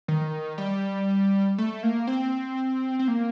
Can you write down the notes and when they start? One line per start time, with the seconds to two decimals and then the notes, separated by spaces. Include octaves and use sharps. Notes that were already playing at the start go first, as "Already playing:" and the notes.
0.08 D#3
0.58 G3
1.58 A3
1.83 A#3
2.07 C4
2.99 C4
3.08 A#3